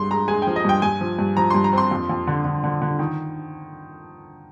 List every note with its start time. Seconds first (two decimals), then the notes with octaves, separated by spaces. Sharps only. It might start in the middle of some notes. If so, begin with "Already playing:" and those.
Already playing: G2 G#3 C6
0.10 G#3 A#5
0.28 G#3 G#5
0.42 G5
0.47 F3
0.56 D#5
0.65 G2 G5
0.82 G2 G#5
1.01 F3
1.19 G2
1.37 F3 A#5
1.50 G2 C6
1.64 A#5
1.73 C4 C6
1.91 F2
2.09 F2
2.27 D3
2.44 D3
2.64 D3
2.82 D3
2.99 D#3